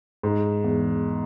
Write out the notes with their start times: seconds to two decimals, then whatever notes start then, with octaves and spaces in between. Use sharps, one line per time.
0.23 G#2
0.64 E2